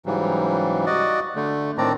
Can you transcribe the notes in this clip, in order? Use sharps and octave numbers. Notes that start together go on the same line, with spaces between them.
G#2 C#3 E3 F#3 G3
F#4 D5 D#5
D3 A3
A2 D#3 C4 D4 D5 A#5